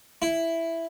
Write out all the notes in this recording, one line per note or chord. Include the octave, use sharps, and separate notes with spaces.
E4